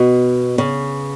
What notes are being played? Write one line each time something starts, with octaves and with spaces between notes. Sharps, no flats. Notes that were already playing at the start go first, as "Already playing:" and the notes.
Already playing: B2
C#3